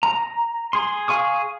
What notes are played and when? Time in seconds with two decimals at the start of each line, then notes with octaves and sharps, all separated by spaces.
0.03 A#5
0.73 G#4 C6
1.08 G#4 F5 G#5 C#6 D#6